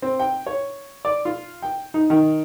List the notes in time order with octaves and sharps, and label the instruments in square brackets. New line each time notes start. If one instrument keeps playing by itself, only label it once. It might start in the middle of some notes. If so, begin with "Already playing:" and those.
[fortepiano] C4
G5
C#5
D5
F4
G5
D#4
D#3